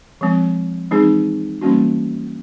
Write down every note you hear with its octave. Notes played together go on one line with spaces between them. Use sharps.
F3 G#3 C4
E3 G#3 C4 D#4 G#4
E3 G3 A#3 C#4 F#4